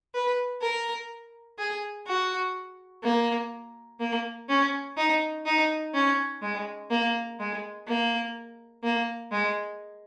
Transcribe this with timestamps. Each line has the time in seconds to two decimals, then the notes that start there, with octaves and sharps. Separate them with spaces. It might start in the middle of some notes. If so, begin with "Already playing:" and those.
0.14 B4
0.62 A#4
1.58 G#4
2.07 F#4
3.03 A#3
4.00 A#3
4.49 C#4
4.97 D#4
5.46 D#4
5.94 C#4
6.42 G#3
6.90 A#3
7.39 G#3
7.87 A#3
8.83 A#3
9.32 G#3